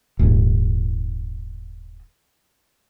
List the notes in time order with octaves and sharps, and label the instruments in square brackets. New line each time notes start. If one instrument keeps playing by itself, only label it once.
[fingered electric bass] D#1 G#2